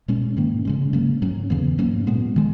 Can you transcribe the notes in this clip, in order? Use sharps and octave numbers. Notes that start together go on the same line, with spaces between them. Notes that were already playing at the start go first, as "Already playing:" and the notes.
B2 G#3 C#4
G#2 D#3 A#3 C#4
C#3 G#3 C#4
C#3 F#3 A#3 C#4
G#2 F#3 C#4
E2 C#3 E3 B3
G#2 F#3 A#3 C#4
A#2 G#3 B3
D#3 G#3